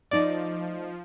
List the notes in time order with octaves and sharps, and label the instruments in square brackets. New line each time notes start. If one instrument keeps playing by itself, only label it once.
[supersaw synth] F3 [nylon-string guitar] A3 D#4 [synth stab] D5